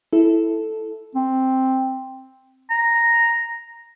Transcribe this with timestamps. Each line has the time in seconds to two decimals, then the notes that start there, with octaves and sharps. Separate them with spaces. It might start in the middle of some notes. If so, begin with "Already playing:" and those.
0.13 E4 A4
1.15 C4
2.70 A#5